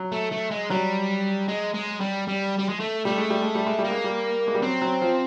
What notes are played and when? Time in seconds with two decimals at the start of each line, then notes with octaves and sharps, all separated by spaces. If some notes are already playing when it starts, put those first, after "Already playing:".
Already playing: F#3
0.12 A3
0.32 A3
0.51 G#3
0.70 F#3 G3
1.48 G#3
1.74 G#3
2.01 G3
2.28 G3
2.58 G3
2.69 G#3
2.80 A3
3.05 G3 A3
3.18 G#3
3.30 G3
3.42 G#3
3.55 G3
3.67 G#3
3.79 G3
3.84 A#3
3.91 G#3
4.04 G3
4.48 G#3
4.55 G3
4.62 F#3 C4
4.82 F#3
5.02 F3